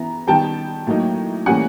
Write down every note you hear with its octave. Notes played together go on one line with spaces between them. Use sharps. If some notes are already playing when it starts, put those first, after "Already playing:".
Already playing: E3 B3 E4 A#5
D#3 G3 B3 G5 A5
A2 F#3 A#3 D#4
A2 E3 G3 A#3 C#4 F#5 G#5